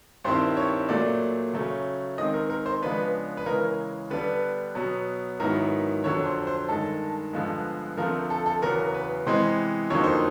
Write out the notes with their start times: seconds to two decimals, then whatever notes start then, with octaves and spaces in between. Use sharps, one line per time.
0.24 G2 D#3 G3 C4 E4 C5
0.57 C#5
0.89 A#2 F#3 A3 D5
1.54 C#3 F#3 A3 C#4
2.18 D#3 G#3 C4 D#5
2.34 A#4
2.50 A#4
2.66 C5
2.82 C#3 F3 G#3 B3 D4 B4
3.37 B4
3.46 C#3 E3 G#3 A#4
4.10 D3 G3 B3 D4 B4
4.75 B2 F#3 B3
5.40 G#2 D#3 F#3 B3 E4 A#4
6.04 F2 D3 F#3 C#5
6.25 C5
6.47 C5
6.69 G2 D#3 G#3 A4
7.33 G2 D3 F3 G#3 B3
7.97 D3 F3 A3 C4 A#4
8.30 A4
8.46 A4
8.62 E2 C#3 F#3 B3 A#4
8.94 B4
9.27 C3 E3 G#3 B3 C5
9.90 F2 D3 F#3 A#3 D#4 C#5
10.04 C5